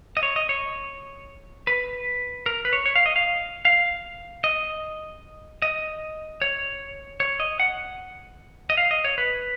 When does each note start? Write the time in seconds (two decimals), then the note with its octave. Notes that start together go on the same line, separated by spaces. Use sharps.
0.17 D#5
0.23 C#5
0.36 D#5
0.49 C#5
1.67 B4
2.46 A#4
2.65 B4
2.73 C#5
2.86 C#5
2.95 F5
3.06 D#5
3.16 F5
3.65 F5
4.44 D#5
5.62 D#5
6.42 C#5
7.20 C#5
7.40 D#5
7.60 F#5
8.70 D#5
8.77 F5
8.91 D#5
9.04 C#5
9.18 B4